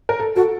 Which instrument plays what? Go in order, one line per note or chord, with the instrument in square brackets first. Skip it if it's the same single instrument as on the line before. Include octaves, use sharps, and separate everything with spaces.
[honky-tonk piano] A#4
A4
[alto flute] F#4 [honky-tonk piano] A4